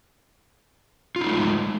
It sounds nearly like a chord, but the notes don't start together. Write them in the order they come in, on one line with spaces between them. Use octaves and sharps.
F4 D#4 A3 G#3